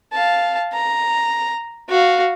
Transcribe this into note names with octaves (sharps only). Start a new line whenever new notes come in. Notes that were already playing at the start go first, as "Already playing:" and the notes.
F5 A5
A#5
F#4 F5